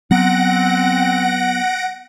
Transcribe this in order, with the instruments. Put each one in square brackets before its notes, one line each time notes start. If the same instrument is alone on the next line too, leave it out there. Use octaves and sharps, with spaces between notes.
[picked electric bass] F#3 B3 [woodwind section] C4 [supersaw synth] F#5 A#6 D7